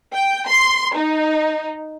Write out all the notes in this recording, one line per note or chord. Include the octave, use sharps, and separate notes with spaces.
G5
C6
D#4